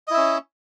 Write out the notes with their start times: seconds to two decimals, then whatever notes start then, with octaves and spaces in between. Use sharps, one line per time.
0.07 D#5
0.11 E4
0.14 E5
0.17 C#4